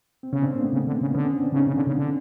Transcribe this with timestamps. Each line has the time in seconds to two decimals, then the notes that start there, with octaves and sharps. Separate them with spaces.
0.23 C4
0.33 C#3 B3 C#4
0.42 C4 D4
0.53 A#3 C4
0.63 A3 B3
0.73 C#3
0.87 D3
1.01 C#3
1.14 D3 B3 C#4
1.36 C4 D4
1.52 D3
1.56 C#3 C#4 D#4
1.67 C#3
1.76 D3
1.87 C#3
1.98 D3